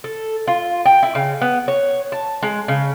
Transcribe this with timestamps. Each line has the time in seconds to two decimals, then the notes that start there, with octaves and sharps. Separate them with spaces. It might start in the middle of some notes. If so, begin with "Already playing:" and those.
0.04 A4
0.47 F4
0.85 G5
1.03 E4
1.15 C#3
1.41 B3
1.68 C#5
2.12 A5
2.43 G#3
2.68 C#3